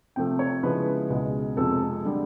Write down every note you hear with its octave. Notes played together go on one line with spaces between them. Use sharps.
C3 F3 A3 G5
C#5
C#3 F3 G#3 B3 E4 B4
C#2 B2 G#3
F2 C3 F3 G#3 A4
D3 G3